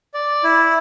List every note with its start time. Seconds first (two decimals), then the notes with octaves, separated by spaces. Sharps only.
0.14 D5
0.44 E4